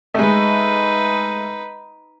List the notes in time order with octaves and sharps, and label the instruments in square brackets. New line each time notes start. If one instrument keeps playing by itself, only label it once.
[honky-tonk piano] G#3 A3 [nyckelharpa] D#4 B4